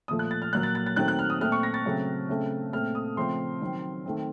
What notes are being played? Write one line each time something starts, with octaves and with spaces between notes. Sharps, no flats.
A#2 F3 A3 D#6
F#6
A6
F6
A#2 F#3 A#3 F#6
A6
A6
A6
D#3 F#3 A3 C4 F#6
F#6
F6
D#6
A#2 A3 C4 F6
C#6
A#6
A6
C#3 F#3 A3 C4
C#3 A3 C4
A#2 A3 C4 F6
D#6
C#3 F3 A3 C4 C6
D#3 F#3 C4
D#3 A3 C4